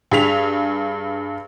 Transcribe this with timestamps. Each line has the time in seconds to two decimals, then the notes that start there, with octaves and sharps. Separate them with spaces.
0.11 G2 G#4 B6 F7